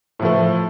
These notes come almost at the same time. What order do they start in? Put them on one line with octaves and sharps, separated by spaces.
A2 F3 A3